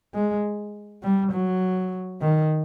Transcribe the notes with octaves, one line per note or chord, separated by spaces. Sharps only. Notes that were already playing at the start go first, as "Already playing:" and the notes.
G#3
G3
F#3
D#3